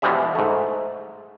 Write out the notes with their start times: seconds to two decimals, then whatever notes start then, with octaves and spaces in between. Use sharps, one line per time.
0.02 B2 E3 F3 G3 G#3 E5
0.35 G#2 A3